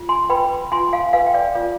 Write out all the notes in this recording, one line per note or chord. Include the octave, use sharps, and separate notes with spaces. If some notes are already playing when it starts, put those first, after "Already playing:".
Already playing: F4
G#5 C6
B4 G5 B5
F4 G#5 C6
F5 G#5
B4 F5 G#5
G5
D5 F5
F4 D5